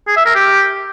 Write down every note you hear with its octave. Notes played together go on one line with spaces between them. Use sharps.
G#4
E5
A#4
G4